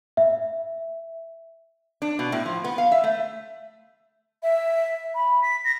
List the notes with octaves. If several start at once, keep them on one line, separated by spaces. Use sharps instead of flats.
E5
D4
B2
A2
F3
B3
F5
E5
A3
E5
B5
B6
A#6